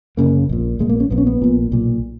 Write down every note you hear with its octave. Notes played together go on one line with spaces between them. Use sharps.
F#1 E2 C#3 A#3
A#1 A#2
A#1 A#2 G#3
A#3
C#4
A#1 A#2 B3
C#4
B3
A#1 A#2
B1 A#2